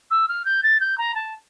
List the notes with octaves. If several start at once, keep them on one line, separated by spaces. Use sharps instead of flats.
E6
F6
G6
A6
G6
A#5
A5